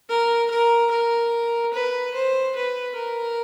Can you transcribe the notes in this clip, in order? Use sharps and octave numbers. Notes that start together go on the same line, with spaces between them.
A#4
A#4
A#4
B4
C5
B4
A#4